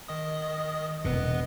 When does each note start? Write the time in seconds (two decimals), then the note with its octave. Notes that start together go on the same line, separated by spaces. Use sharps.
0.08 D#3 D#5 D#6
1.05 E1 C3 B3 B4 D#5